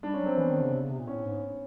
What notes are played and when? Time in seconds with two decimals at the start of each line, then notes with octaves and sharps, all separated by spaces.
0.03 G3 D4
0.14 C#4
0.20 F#3
0.26 C4
0.37 E3 B3
0.50 D#3
0.61 C#3
0.73 C3
0.81 C#3
0.90 C3
0.99 A#2
1.07 A2 C#4
1.25 G#2